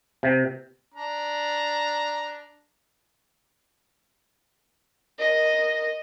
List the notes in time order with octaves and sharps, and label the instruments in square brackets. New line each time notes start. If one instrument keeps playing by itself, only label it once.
[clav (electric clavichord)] C3
[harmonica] D4 A#5
[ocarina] A#4 [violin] D#5